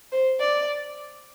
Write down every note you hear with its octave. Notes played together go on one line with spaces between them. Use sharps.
C5
D5